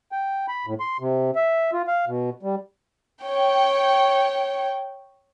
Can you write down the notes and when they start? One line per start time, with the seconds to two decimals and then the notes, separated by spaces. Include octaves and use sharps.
0.12 G5
0.48 B5
0.66 A2
0.80 C6
1.00 C3
1.36 E5
1.73 F4
1.88 F5
2.07 B2
2.43 G3
3.23 C#5 G5